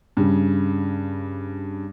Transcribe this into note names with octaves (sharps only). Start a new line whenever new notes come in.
G2 C#3